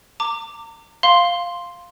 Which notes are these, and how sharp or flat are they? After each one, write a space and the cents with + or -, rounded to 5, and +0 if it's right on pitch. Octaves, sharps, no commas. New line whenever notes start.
A#5 -40 D6 +0
F5 +0 C6 +0